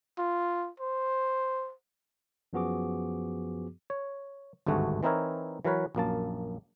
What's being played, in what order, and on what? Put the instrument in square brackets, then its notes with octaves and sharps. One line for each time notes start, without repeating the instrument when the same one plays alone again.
[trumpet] F4
C5
[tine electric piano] F#2 F3 B3 F#4 G#4 D6
[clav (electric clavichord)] C#5
G#1 D2 G2 A3 F#4 G#4
E3 C4 D#4 E4 A#4 C#5
E3 F#3 A#4 B4 C#5
A#1 F#2 A#3 A5